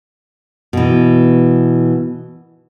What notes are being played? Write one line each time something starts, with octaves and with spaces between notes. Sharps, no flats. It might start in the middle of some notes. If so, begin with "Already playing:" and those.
B2 E3